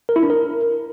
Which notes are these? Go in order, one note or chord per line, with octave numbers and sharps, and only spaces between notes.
A#4
E4
D4
A#4